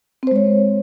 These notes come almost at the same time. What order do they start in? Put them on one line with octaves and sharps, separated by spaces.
C4 C5 G#3 C#5